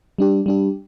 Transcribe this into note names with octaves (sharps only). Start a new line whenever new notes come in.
G3 D4 G4
G3 D4 G4